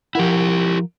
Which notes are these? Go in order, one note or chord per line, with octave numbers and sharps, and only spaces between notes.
F3 E4 G4 A#4 F#5